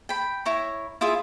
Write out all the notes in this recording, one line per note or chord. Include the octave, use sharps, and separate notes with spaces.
G5 B5
E4 C#5 A#5
E4 F4 G#4 E5